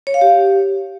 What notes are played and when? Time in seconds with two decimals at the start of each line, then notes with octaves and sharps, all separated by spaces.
0.07 C#5
0.14 F5
0.21 G4